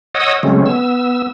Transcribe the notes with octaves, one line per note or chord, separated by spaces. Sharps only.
C#5 D#5 F#5 D#6 E6
C#3 F#3 G#3 A3 C4 C#4
B3 E6